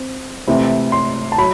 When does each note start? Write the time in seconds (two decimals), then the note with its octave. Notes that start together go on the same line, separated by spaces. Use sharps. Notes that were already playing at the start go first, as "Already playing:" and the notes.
Already playing: C4
0.48 C3 E3 A3 C4 E4
0.92 C6
1.32 A5
1.38 F#3 B5